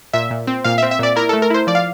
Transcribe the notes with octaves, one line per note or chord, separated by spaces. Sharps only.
A#2 E5
A#2
C4
A#2 F5
E5
C4
E5
A#2 D5
E4 A#4
A4
A3
A#4
E4 C5
F3 D5
F5